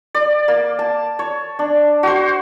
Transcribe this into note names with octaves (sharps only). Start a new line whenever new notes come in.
D5
A#3
A5
C#5
D4
F#4 C5